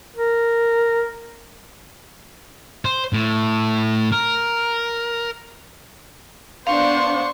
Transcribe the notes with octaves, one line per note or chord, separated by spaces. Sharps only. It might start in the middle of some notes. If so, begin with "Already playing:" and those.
A#4
C5
A2
A#4
B3 D4 C5 F5 C6 C#6